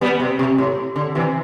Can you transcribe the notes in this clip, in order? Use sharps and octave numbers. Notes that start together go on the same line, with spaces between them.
G3 B3
C3
C3
A2
D3
C3 E3